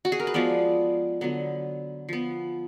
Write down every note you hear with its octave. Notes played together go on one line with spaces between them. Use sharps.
F#4
G#4
A#4
B4
F3 G#3 B3 D5
D3 F#3 B3
F3 B3